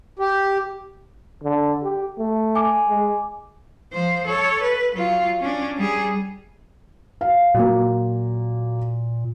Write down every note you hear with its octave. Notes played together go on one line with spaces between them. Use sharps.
G4
D3
G4
A3
G#5 D6
G#3
F3 C5
A4 C#5
B4
F#3 F4
C#4 D4
G3 G#4
F5
A#2 F#3 A#3